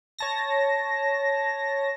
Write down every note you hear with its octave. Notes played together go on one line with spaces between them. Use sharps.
C#5 A5 A#6